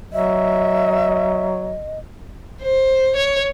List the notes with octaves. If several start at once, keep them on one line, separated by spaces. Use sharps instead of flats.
F#3 D#5 E5
C5
C#5